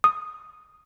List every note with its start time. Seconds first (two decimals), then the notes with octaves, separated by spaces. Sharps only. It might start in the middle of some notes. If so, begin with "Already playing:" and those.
0.04 D#6